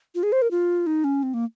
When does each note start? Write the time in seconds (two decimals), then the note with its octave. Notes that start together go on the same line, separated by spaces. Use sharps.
0.15 F4
0.23 G#4
0.32 C5
0.42 A#4
0.51 F4
0.87 D#4
1.04 C#4
1.23 C4
1.34 A#3